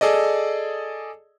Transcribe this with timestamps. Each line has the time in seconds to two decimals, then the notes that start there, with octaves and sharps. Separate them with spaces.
0.01 G#4 A4 D5 D#5